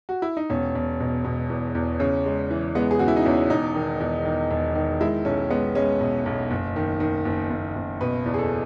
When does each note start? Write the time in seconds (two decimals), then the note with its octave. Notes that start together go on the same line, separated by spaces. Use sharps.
0.09 F#4
0.22 E4
0.37 D#4
0.50 E1 C#4
0.75 E1
1.00 B2
1.24 B2
1.50 E2
1.75 E2
2.00 C#3 C#4
2.26 G#3
2.51 E3
2.75 G#3 B3
2.91 G#4
2.99 C#3 F#4
3.08 E4
3.16 D#4
3.26 E2 C#4
3.50 E1 D#4
3.75 D#3
4.00 E2
4.25 D#3
4.51 E1
4.75 D#3
5.01 G#3 E4
5.25 B1 C#4
5.50 G#3 B3
5.75 G#3 C#4
6.00 B2
6.26 B1
6.51 F#1
6.76 D#3
7.00 D#3
7.25 F#1
7.51 F#1
7.75 F#1
8.01 B2 B4
8.26 E2
8.34 G#4
8.38 A4